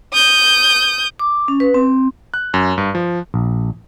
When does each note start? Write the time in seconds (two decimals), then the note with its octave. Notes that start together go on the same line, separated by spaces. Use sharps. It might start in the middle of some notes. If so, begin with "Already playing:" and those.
0.13 D#6 G6
1.19 D6
1.48 C#4
1.60 B4
1.74 C4
2.34 F#6
2.54 F#2
2.78 G2
2.95 F3
3.34 A#1